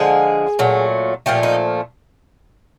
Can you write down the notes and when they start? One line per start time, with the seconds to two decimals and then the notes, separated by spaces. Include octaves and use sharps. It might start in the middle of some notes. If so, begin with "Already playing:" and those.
Already playing: D3 F3 G#3 G#4
0.59 A#2 F#3 A3
1.26 A#2 F3 A3 G4
1.43 D#4